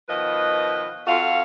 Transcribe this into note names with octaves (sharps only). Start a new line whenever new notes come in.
B2 D#3 F3 B4 D#5
F2 F#4 A4 F5